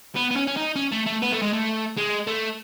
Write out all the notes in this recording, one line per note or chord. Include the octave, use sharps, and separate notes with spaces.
B3
B3
C#4
C#4
D#4
C#4
A3
A3
B3
A3
G#3
A3
G#3
A3